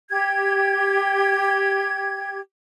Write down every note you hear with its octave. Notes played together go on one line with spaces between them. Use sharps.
G4 G#6